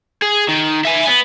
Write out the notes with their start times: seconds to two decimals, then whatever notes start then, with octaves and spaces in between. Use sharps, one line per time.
0.22 G#4
0.48 D#3
0.85 E5 G#5
1.07 B3